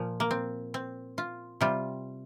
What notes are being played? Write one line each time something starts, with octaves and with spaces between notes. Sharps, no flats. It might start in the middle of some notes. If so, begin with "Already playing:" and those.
Already playing: A#2 F3
A#3
C4
C4
F4
C3 G3 F4